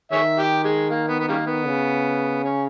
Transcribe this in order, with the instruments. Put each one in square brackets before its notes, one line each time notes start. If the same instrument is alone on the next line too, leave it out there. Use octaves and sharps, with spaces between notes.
[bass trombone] D#3 [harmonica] G#4 C#5 E5
[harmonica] G4
G#3
A#3
B3
B3
C#3 G3 A#3
B3
[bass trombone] C#3
[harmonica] C#4